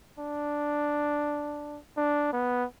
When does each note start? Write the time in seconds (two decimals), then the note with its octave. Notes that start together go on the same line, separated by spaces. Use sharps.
0.19 D4
1.97 D4
2.33 B3